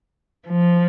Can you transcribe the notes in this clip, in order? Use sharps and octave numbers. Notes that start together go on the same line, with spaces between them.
F3